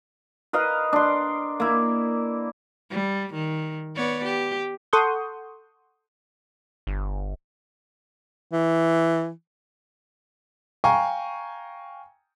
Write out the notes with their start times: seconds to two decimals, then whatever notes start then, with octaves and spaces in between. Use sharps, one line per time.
0.53 A#4 B4 D#5 F5
0.93 D4 C6
1.60 A#3 E4
2.91 G3
3.34 D#3
3.96 B3 C#5 D5
4.25 G4
4.93 A4 F#5 C6 C#6 D#6 G6
6.87 G1
8.53 E3
10.84 F5 G5 G#5 A#5 C#6